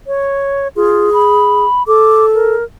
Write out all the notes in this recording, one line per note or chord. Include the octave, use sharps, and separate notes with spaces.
C#5
F4 G#4
B5
A4 D6
A#4